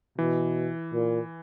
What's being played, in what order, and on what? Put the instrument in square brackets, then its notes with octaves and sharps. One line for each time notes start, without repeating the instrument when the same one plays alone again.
[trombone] B2 [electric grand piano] E3
[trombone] A#2